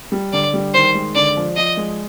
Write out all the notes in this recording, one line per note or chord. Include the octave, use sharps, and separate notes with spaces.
G3
D3 D5
G3
D#3 C5
G#3
D3 D5
F3
F3 D#5
G#3